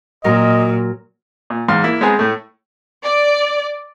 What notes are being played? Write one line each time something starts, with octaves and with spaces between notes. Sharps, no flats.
A#2 F#3 A#4 D#5
A#2
E2 G#2 F5 C6
A#3 E4
G#3 B3 C4 G#4 G#5 A#5
A2 A3
D5